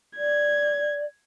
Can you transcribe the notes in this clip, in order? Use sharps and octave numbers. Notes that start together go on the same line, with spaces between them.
D5 G#6